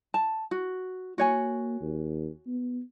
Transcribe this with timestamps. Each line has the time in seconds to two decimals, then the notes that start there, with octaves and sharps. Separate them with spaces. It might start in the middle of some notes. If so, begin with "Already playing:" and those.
0.14 A5
0.51 F#4
1.18 A#3 F#4 C#5 G#5
1.81 D#2
2.47 B3